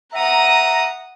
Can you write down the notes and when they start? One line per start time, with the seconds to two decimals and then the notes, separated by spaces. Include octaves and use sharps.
0.12 E5 F#5 A#5 D#6